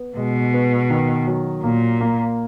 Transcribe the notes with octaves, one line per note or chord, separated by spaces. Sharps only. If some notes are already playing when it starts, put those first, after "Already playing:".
Already playing: B3
B2 G#3
B3
D#3
F#3
A#2 A#3
A#3